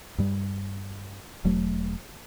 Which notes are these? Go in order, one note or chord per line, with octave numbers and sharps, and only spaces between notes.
G2 G3
E1 F#3 A3